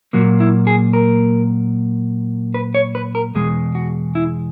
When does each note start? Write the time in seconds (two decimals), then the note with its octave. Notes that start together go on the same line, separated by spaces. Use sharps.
0.13 A#2 F#3 A#3 F#4
0.40 E4
0.67 G#4
0.93 A#4
2.54 B4
2.75 C#5
2.95 B4
3.15 A#4
3.35 E2 B2 G#3 G#4
3.75 F#4
4.15 E4